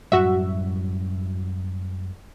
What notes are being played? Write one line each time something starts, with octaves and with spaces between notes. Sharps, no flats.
F#2 A2 G3 F#4 E5